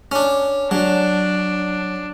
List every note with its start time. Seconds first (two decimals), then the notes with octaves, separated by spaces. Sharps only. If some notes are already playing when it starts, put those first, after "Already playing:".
0.12 C#4 D4
0.71 F#3 D4